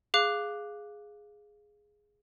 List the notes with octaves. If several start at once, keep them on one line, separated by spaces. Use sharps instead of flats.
G#4 F5 D6 F#6